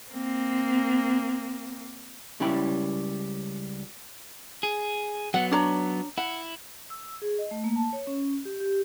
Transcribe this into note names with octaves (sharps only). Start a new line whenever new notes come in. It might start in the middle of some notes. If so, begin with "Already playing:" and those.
A#3 C4
C#2 G3 C#4 E4 G5 B5
G#4
F#3 B3 F#5
D4 C#5 A#5
E4 F#5
E6
G#4
D#5
A3
A#3
A5
C#5
C#4
G4
G4